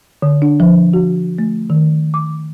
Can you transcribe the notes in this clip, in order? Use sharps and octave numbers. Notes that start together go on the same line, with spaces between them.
D3
D4
F3
F#4
A3
D#3
D6